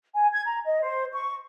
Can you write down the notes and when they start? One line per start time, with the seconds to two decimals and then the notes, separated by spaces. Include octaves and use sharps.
0.15 G#5
0.32 G#6
0.46 A#5
0.65 D#5
0.82 C5
1.13 C#6